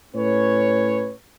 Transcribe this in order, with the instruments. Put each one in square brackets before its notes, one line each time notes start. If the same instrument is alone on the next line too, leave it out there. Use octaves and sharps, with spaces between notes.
[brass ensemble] A2 C#4 B4 C#5